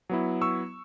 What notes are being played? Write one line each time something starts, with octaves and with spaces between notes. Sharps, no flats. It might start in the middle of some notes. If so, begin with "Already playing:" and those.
F#3 B3 E4
C#6 E6